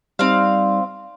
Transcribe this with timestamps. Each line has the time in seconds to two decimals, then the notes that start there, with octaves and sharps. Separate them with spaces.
0.19 G3 C4 D#4 D5 F5